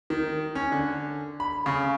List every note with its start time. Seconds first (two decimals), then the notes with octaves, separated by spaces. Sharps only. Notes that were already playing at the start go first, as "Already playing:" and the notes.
0.10 D#3
0.55 C#4
0.72 D3
1.40 B5
1.66 C#3